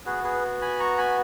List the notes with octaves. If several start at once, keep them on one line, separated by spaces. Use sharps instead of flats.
B3 F#4 G#4 B4
G#4 B4
G#5 B5
A#5 C#6
G#5 B5